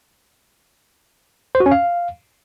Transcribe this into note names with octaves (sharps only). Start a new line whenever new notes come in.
C5
F#4
C#4
F5